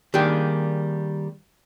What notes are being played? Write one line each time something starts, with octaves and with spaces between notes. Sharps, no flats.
D#3 G3 A#3 D4 G4 G#4